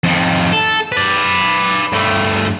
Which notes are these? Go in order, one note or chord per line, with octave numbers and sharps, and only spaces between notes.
F2 D#3
A4
B4 D5
G2 A3